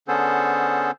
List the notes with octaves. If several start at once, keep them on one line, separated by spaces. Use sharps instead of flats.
D3 B3 C#4 G#4 A4 C5